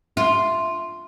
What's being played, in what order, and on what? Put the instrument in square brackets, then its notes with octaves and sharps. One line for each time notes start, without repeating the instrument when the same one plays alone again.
[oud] F4